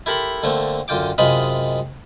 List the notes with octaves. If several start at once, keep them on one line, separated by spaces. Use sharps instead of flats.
E4 G4 A4 A#4 B5 C6
D3 A3 A#3 C4
F#2 D3 F4 G5 D6
F#2 C3 G#3 F4 D#5 B5